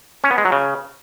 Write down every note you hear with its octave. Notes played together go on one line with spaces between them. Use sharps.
C#4
B3
G#3
F#3
C#3